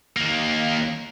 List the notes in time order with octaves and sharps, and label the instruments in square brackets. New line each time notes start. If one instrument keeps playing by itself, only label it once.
[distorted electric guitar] D#2 A#3